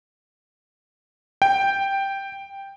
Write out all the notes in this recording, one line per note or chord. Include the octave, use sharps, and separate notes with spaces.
G5